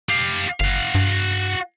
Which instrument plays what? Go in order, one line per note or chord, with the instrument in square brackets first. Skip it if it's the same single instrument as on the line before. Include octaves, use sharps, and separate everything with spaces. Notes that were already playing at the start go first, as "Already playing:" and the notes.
[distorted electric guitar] G4 F5
[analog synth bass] G1 [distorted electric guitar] F#4 F5
[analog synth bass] G2